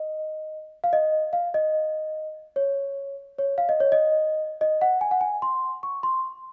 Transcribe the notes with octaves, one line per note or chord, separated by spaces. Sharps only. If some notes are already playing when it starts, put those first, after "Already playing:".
Already playing: D#5
F5
D#5
F5
D#5
C#5
C#5
F5
D#5
C#5
D#5
D#5
F#5
G#5
F#5
G#5
C6
C#6
C6